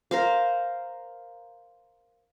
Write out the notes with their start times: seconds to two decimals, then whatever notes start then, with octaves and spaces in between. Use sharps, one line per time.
0.11 A#4 C5 F5